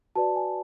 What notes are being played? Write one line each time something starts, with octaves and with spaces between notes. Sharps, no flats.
F#4 B4 D5 A5
G#5